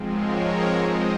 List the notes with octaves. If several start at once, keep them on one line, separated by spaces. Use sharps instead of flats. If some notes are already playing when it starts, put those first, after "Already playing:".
Already playing: G#2 F3 G#3 C4
A#4 C#5
C5 D#5